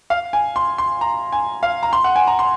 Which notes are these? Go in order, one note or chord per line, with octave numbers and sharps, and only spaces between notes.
F5
G#5
C6
C6
A#5
G#5
F5
A#5
C6
F#5
G#5
A#5
C6